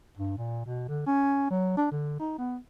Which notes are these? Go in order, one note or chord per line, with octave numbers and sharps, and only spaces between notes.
G2
A#2
B2
D3
C#4
F#3
D4
D3
D#4
B3